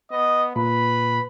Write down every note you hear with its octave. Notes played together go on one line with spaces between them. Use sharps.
B3 D#5
A#2 B4 B5